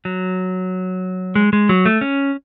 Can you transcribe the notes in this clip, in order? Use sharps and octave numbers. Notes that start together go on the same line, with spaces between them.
F#3
G#3
G#3
F#3
A3
C#4